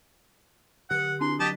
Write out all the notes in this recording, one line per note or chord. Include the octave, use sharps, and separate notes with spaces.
D3 G4 F#5 F#6
C4 D4 A#5 C6
F#3 G4 D#5 A5 B6